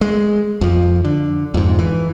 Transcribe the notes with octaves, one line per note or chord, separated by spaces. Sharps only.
G#3
F2 F3
D3
F2 G#2
E3